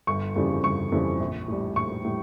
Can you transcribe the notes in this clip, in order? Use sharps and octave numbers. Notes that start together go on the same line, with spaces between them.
G1 C#6
F2 C#3 E3 G3
G1 C#6
F2 C#3 E3 G3
A#1
A2 G3
A#1 C#6
A2 G3